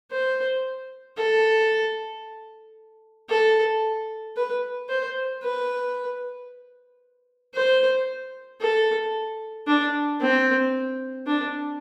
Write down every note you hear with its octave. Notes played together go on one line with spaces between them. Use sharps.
C5
A4
A4
B4
C5
B4
C5
A4
D4
C4
D4